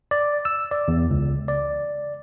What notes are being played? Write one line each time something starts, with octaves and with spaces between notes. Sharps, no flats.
D5
E6
D5
E2
C#2
D5